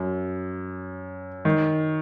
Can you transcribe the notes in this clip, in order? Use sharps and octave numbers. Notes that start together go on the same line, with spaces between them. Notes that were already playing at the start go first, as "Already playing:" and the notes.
Already playing: F#2
D#3